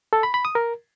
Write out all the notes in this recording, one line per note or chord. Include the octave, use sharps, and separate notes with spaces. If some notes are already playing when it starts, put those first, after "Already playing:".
A4
B5
B5
D#6
A#4